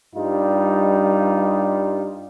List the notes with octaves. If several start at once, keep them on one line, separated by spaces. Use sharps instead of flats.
G2 G3 D#4 F4